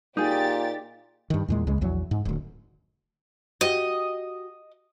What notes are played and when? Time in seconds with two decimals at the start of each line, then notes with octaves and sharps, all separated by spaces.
0.17 A#2 D#4 G4 G#4 A6
1.30 G2 D#3
1.48 E2 A#2 G#3
1.67 C#2 C#3 G#3
1.81 A#1 E2 F#3
2.11 G#2
2.25 D1 D2
3.61 F#4 G4 D#5